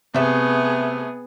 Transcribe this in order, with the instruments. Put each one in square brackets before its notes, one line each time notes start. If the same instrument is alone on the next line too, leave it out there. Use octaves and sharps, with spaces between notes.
[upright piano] C3 [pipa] A3 E5 [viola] B3 G#4